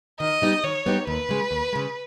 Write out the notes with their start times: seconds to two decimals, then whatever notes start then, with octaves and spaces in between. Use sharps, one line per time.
0.20 D#3 D#5
0.42 G3 B3 D#4 G4
0.64 D#3 C#5
0.86 G3 B3 D#4 G4
1.07 D#2 B4
1.29 C#3 G#3
1.51 D#2
1.73 C#3 G#3